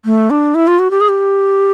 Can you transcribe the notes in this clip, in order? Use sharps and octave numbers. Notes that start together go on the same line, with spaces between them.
A3
D4
E4
F4
F#4
G4
G#4
G4